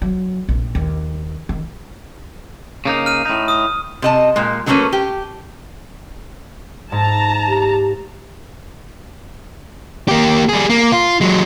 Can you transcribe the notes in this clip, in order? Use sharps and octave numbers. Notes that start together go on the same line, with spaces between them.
F#3
A#1
D#2
D#3
C#3 A#3 D#4
F6 D#7
A2 D#4
D#6
C3 D#5 A5
A#2 G#3
D3 F#3 A3 A#3 C#4 B4
G4
G#2 A5 A#5
G4
A#3 G4
G3 G#4
A#3
F4
F#3 G#3